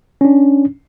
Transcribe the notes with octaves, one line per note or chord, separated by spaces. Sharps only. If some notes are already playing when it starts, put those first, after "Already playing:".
C#4 D4